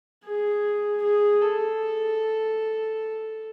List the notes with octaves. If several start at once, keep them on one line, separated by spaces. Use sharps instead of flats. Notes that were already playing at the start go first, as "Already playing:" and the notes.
G#4
G#4
A4